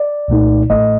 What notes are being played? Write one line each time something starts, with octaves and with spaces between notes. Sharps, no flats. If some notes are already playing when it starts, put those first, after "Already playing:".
Already playing: D5
C2 A#2 A3 D#4
A1 A2 A3 D#5